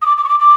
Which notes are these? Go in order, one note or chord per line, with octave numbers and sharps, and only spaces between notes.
D#6
D6
D6
C#6
D6
D6